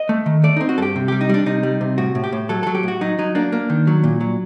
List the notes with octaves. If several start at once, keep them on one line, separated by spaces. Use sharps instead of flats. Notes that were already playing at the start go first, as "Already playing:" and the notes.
Already playing: D#5
A3
D#3
A3 D5
C4 D#4
F#4
G2 G4 A4
C3
G3 G4
D#4
G3 D4
C3 D#4
G3
C3
A2 F#4
A2
G4
A2
F#3 A4
F#3 A4
G4
A2 F#4
F#3 D#4
F#3 D#4
A#3 D4
A#3
D#3
F#3
A#2
F#3